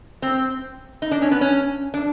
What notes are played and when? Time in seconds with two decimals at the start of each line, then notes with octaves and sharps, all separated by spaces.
0.22 C4
1.02 D#4
1.11 D4
1.22 C#4
1.31 B3
1.41 C#4
1.94 D4